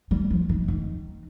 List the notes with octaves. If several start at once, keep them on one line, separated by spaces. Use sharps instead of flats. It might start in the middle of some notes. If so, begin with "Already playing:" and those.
G3
F3
D#3
D#3